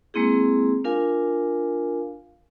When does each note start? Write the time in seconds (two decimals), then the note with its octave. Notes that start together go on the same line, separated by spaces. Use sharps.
0.14 G#3 A#3 C4 E4 G#4
0.84 D4 F4 A#4 F5 G#5